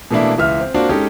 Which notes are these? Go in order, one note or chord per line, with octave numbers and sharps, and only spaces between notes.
B2 E3 A3 A#3 D4 E4
C#2 E3 E5 F6
C4
A#3 C4 D4 F4 F#4
G#3 C#4 D#4 G4 A4